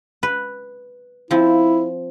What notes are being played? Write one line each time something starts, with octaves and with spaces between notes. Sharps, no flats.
B4
F3 C4 E4